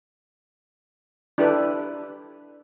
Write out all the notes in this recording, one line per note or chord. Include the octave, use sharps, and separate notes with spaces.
D4 E4 G4 A4 B4